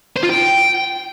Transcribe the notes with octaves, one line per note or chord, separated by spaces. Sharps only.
C5
F4
G5